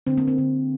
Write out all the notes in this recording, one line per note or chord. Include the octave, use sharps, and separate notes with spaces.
D3 A#3 C4
A#3
C4
D3 A#3